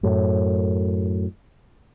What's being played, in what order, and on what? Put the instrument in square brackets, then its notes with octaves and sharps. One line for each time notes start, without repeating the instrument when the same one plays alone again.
[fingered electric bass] F#2 A2